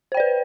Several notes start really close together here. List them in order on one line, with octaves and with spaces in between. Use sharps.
C5 G5 D5 B4